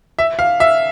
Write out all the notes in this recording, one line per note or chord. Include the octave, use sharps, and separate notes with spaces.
E5
F5
E5